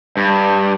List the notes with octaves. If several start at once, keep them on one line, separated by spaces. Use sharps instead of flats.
G2